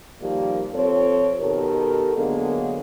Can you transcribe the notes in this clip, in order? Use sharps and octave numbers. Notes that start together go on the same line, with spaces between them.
D#3 F3 G3 A#3 G4
F3 C4 F4 A4 C#5
B2 D#3 G4 A4 A#4
D3 F#3 G#3 A#3 B3